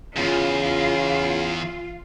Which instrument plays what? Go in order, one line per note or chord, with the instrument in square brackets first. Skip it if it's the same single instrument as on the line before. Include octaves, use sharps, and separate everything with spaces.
[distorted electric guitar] E2 [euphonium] C#3 [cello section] F4